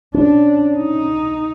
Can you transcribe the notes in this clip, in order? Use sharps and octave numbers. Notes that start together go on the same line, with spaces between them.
C#4 D4
D#4